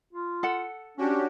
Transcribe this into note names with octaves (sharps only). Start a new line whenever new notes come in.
F4
A4 F#5
C#4 D4 F#4 G4